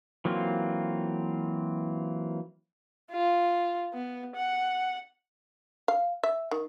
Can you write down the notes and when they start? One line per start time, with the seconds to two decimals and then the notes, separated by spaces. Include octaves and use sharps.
0.25 E3 F#3 A#3 C4 F4
3.12 F4
3.94 B3
4.36 F#5
5.88 F5
6.23 E5
6.51 D#3